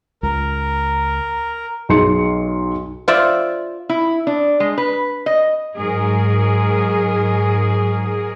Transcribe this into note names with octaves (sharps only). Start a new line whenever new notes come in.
C#2 A#4
B1 G#4 C6 C#7
F4 C5 D5 E5
E4
D4
G#3
B4
D#5
G#2 F#3 G#4 A#4